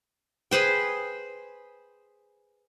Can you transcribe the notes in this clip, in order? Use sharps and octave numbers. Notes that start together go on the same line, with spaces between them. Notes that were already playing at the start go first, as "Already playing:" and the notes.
G#4 B4 C5 G5